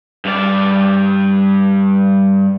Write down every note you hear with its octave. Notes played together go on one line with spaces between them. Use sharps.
G2 D5